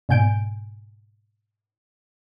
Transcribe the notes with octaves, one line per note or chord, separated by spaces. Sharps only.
G#2 B2 G#5 G6 D7